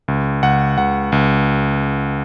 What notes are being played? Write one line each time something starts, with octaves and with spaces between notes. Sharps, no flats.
C#2
C#2 F#5
C#2 F#5
C#2